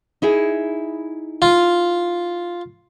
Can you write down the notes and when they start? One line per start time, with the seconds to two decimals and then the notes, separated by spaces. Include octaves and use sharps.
0.22 D#4 E4 G#4
1.42 F4